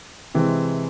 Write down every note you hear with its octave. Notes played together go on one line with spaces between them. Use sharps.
C3 E3 G#3 C4